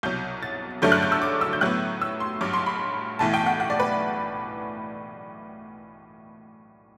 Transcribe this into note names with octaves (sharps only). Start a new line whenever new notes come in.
C2 B2 F#3 G6
A6
G2 D3 F#3 A3 D4 G6
F#6
G6
E6
D6
E6
G6
A2 F#3 B3 F#6
E6
C6
A1 G2 F#3 D6
C6
B5
B1 A2 E3 A5
G5
F#5
F#5
D5
B4